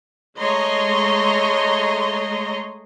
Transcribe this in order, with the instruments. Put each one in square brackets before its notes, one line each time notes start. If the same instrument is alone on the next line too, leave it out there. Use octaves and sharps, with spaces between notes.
[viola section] G#3 A3 C#5 D#5 A#5 C6